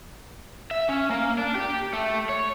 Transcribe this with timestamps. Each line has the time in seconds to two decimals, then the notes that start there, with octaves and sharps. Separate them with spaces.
0.71 E5
0.89 C#4
1.10 A#3
1.38 D4
1.55 G4
1.93 A3
2.29 C#5